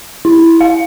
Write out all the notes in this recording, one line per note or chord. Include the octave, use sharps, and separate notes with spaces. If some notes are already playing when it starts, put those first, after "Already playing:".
E4
F5